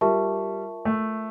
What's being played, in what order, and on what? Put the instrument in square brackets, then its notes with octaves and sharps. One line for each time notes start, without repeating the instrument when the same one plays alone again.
[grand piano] G3 [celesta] F4 A#4 E5 A5 C#6
[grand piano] A3